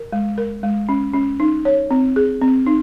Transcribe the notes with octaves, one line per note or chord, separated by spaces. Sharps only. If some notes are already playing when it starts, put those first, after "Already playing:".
Already playing: A#4
G#3
A#4
G#3
C#4
C#4
D#4
C#5
C4
G#4
C4
D#4